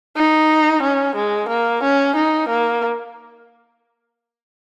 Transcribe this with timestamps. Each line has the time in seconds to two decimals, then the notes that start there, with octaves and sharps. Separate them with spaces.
0.17 D#4
0.83 C#4
1.16 G#3
1.49 A#3
1.84 C#4
2.16 D#4
2.49 A#3